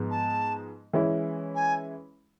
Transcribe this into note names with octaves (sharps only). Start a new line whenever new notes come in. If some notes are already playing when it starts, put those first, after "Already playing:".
Already playing: G#2 F3 G#3 B3
A5
E3 G#3 C#4 E4
G#5